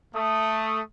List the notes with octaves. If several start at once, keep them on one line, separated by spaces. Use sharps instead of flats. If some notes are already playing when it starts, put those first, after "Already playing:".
A3 D#6